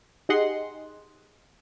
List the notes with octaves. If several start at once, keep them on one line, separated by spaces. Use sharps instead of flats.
D#4 G4 G#4 D#5 F#5 C6